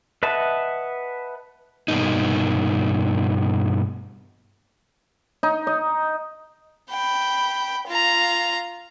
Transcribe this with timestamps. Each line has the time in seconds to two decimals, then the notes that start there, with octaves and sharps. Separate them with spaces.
0.23 B4 D#5 E5 F#5 A5
1.88 G2 B2 A#3 D#4
5.43 D#4
5.67 D#5
6.91 G5 B5
7.87 F4 A#5